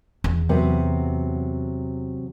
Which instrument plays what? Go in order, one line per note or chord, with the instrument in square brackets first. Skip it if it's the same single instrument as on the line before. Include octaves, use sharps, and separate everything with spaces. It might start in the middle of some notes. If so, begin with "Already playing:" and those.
[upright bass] E2
[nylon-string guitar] C3 F#3 B3